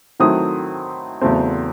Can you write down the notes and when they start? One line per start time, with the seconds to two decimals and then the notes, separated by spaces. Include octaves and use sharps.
0.20 D#3 F#3 A3 C4 E4 D#6
1.21 E2 C#3 F#3 A3 C4